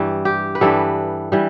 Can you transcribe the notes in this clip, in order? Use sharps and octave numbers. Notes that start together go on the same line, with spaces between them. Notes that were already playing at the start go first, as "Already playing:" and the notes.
Already playing: G2 E3 G3
G4
B4
G2 E3 G3 A4
E3 G3